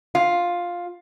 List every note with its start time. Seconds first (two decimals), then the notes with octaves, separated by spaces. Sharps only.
0.15 F4